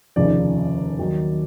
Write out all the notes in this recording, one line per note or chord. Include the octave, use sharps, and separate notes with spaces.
F1 D#2 C#3 F3 D5
D#2 D#3 F#3